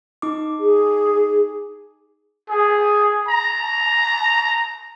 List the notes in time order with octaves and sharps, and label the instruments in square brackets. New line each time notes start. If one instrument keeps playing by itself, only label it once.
[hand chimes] D#4 D6
[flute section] G#4
[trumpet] G#4
A#5